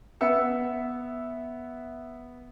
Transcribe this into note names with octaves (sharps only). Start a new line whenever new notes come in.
B3 E5 E6 C#7